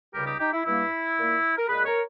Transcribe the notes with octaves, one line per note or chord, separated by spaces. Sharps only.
C#2 C#3 G3 G4 A#4
D#4 G4
D#4 G4
E4
G2 G3 A#3 E4
A#2 A#3
A#4
A#2 G#3 G#4 B4
A#4 C#5